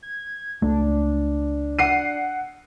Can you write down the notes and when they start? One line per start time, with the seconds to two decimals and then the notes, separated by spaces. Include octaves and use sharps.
0.03 G#6
0.62 C#2 A3 D4
1.79 F#5 C7 D#7